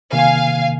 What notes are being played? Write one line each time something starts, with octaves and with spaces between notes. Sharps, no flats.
C3 D#3 A#3 F5 G#5